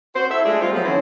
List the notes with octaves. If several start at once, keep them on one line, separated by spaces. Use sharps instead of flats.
F#4 C5
E4 A4 E5
G#3 A3 D4 F4 G#4
G3 C4 F4
F3 F#3 A3 B3
D3 E3 C4 C#4 E4